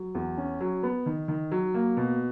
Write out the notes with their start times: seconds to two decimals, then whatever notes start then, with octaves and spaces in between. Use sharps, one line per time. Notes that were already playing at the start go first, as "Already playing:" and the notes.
Already playing: F#3
0.15 E2
0.38 C#4
0.61 F#3
0.83 B3
1.06 D#3
1.28 D#3
1.51 F#3
1.74 A#3
1.97 B2